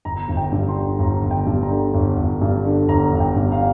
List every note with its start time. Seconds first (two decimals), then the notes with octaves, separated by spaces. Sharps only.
0.05 G1 A#5
0.28 G1
0.37 G5
0.52 G2
0.68 C6
0.76 D3
0.99 G1 A#5
1.23 G1
1.31 G5
1.46 G2
1.62 A#5
1.71 D3
1.94 G1
2.18 G1
2.41 G2
2.64 D3
2.88 G1 A#5
3.13 G1
3.20 G5
3.36 G2
3.52 F5